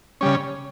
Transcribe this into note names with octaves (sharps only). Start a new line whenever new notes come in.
C#3 G3 C#4